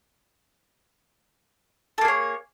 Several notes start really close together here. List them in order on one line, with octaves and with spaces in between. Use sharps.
A4 A#3 G#4 C#5